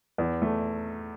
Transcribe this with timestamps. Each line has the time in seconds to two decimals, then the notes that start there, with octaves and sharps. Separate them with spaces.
0.18 E2
0.42 A3